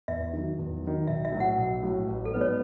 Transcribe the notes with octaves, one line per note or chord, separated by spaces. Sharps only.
E2 E5
D#3 F#3
E2
D#3 F#3
B1 E5
E5
A2 F#3
F#5
B1
A2 F#3
A1
A4
G#2 F#3 B3 B4
C#5